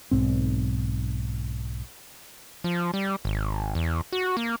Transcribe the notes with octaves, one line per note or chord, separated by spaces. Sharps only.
B1 G#2 C4
F3
G3
G#1
E2
F#4
A#3